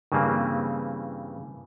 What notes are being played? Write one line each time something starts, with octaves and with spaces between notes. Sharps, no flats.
G2 C#3 E3 G3 A#3 C4